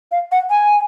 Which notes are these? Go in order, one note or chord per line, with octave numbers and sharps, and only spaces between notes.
F5
F#5
G#5